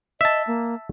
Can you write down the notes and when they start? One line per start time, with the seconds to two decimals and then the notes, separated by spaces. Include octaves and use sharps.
0.21 D#5 E5 A5
0.47 A#3